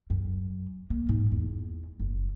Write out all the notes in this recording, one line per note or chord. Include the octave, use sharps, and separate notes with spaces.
F#2
A#3
G#2
E2
F#1